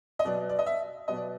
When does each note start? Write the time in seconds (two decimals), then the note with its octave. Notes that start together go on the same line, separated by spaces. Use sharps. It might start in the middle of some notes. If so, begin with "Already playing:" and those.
0.19 D#5
0.25 B2 F#3 B3 D5
0.49 D5
0.59 D#5
0.66 E5
1.08 B2 F#3 B3 D#5
1.17 D5